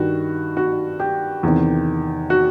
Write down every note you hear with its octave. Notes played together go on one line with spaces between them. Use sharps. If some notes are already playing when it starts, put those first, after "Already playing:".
Already playing: G2 D#3 F#4
F#4
G4
E2 C3 D#3
F#4